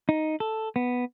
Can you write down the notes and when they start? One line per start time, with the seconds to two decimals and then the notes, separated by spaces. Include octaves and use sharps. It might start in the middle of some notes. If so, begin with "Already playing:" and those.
0.09 D#4
0.40 A4
0.76 B3